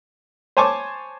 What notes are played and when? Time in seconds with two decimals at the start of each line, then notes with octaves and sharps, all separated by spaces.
0.57 C5 C#5 G#5 A5 C#6 D6